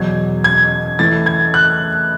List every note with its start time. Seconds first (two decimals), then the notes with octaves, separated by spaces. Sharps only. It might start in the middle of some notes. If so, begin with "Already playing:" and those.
Already playing: E2 B2 F#3 G#6
0.44 G#6
0.99 A2 E3 A3 A6
1.26 G#6
1.54 F#6